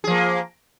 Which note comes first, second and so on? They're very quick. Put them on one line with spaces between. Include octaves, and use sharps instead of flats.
G#4 F3 A#3